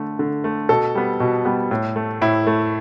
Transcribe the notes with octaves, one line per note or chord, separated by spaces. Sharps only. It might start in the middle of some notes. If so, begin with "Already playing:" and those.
Already playing: D3 A3
D3
A3
B2 A4
G3 B3
B2
G3 B3
A2
A3
A2 E4
A3